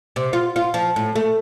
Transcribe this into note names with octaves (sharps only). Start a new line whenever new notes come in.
C3
F4
F4
F3
A2
A3